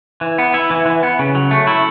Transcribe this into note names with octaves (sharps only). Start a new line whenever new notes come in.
E3
B3
E4
E3
E3
B3
C#3
F#3
A3
E4